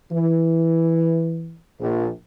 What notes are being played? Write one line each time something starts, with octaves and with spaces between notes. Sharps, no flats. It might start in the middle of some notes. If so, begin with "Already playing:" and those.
E3
A#1